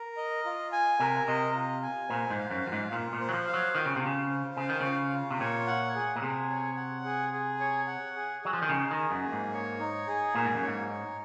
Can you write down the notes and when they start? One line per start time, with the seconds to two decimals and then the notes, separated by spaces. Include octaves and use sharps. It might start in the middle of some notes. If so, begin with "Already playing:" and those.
Already playing: A#4
0.17 D#5
0.45 F4
0.72 G#5
1.00 C3 A#4
1.28 C3 D#5
1.55 F4
1.83 G#5
2.09 A#2 C5
2.30 G#2
2.37 F5
2.51 F#2
2.65 F#2 F4
2.72 G#2
2.92 A#2 F4
3.13 A#2
3.20 C5
3.29 F#3
3.33 F3
3.47 F5
3.54 F#3
3.75 D#3 F4
3.86 C#3
3.96 C3
4.02 C#3 F4
4.30 C5
4.57 C#3 F5
4.69 D#3
4.80 C#3 F4
5.12 F4
5.30 C3
5.40 A#2 C#5
5.67 F#5
5.95 G#4
6.16 A#2
6.22 C3 G#4
6.50 C#5
6.77 F#5
7.05 G#4
7.33 G#4
7.60 C#5
7.87 F#5
8.15 G#4
8.42 F#3 G#4
8.53 F3
8.62 D#3
8.69 C#3 D#4
8.91 D#3
8.98 G#4
9.11 F#2
9.25 A#3
9.32 G#2
9.53 C#5
9.80 D#4
10.07 G#4
10.35 A#2 A#3
10.45 G#2
10.55 F#2
10.62 G#2 C#5
10.89 D#4